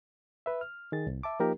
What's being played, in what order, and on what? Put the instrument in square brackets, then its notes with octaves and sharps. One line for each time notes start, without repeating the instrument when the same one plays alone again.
[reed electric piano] B4 E5
F6
D#3 G#4 A6
C2
E5 A5 D6
F3 A#3 D#4 G4 A#4